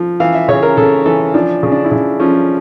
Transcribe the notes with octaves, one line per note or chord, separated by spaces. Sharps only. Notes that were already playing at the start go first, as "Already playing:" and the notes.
Already playing: F3
E3 F5
E5
C#3 C#5
A#4
C#3 A4
E3 A4
F3 D4
C#3
D4
E4
C#3 D4
F3 C#4